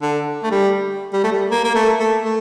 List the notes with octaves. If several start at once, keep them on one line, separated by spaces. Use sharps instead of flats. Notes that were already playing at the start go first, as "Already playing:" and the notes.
D3
A3
G3
G3
A3
G3
A#3
A#3
A3
A3
A3